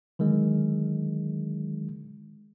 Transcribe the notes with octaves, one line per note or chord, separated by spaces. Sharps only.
D3 D#3 F#3 G#3